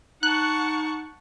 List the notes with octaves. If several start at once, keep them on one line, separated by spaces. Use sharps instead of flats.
D#4 F#5 A5 C#6 F#6